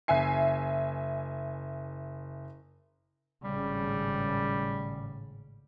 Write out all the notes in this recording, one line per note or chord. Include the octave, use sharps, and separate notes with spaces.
F#1 E5 G#5 C7
G#1 A2 C#3 G3